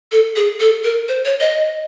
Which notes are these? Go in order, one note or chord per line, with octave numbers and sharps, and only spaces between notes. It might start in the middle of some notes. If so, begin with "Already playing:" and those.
A4
G#4
A4
A#4
C5
C#5
D#5